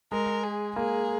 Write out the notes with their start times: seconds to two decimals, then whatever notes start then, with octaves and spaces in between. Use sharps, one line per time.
0.12 G#3 A#4
0.44 G#4
0.76 A#3 G#4